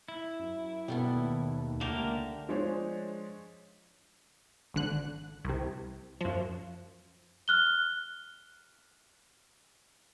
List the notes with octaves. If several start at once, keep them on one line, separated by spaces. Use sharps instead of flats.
E4
F#2
B2 G3 A3 B3
D#2
C#2 D3 A3 A#3 G4 A#4
F3 G#3 D4 G#4 C5 C#5
G#1 D3 F#6
C2 C3
F#2 F3
F6 F#6 G7